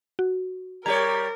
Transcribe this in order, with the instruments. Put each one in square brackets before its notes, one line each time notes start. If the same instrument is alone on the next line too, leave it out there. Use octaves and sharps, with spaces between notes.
[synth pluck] F#4
[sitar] G3 G4 C#5 [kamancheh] A#4 [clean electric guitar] A#5 [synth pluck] G#6